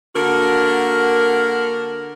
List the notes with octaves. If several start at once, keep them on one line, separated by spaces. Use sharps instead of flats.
D3 A#3 F#4 A#4